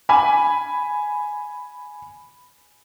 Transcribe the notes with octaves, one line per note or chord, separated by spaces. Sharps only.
G#5 B5